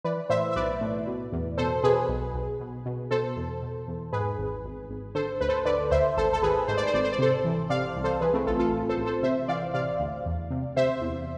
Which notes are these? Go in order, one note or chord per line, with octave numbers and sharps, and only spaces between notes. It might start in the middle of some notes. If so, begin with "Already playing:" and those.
E3 B4 D5
A2 C5 E5
E5
B1 B4 D5
A2
B2
E2
B2 A4 C5
B2 G#4 B4
B1
B1
B2
B2
B2 A4 C5
E2
B2
E2
G#2 G#4 B4
G#1
G#1
G#1
D3 A4 C5
D2 B4
A4 C5
D3 B4 D5
D2 C5 E5
G#1 A4 C5
A4
G#1 G#4 B4
G#2 C5
D5
C5
G#1 D5
C5
D5
C3 A4 C5
E3
C3 D5 F5
C2
A4 C5
E3 G#4 B4
A3 C4
A1 F4 A4
F4 A4
A1
A4 C5
A1
A4 C5
C3 C5 E5
E3 D5 F5
C3 D5 F5
D2
E2
C3
C3 C5 E5
E2